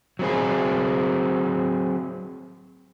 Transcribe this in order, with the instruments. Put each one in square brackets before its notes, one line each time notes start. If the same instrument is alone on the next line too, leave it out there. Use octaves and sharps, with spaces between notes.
[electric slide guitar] F#3 C4 G#4